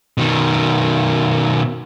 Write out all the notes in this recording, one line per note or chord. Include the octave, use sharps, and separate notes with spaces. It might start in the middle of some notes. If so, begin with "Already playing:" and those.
B2 D#3